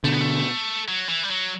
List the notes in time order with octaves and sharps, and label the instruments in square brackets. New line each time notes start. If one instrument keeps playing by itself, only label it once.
[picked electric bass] B2 D3 [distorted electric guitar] A3
[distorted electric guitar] B3
A3
F#3
E3
G3
F#3